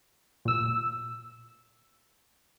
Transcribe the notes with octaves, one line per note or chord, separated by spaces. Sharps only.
A#2 E6